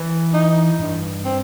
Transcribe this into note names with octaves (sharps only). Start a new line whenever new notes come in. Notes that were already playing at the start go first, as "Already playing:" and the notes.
Already playing: E3
D#4
G2
C4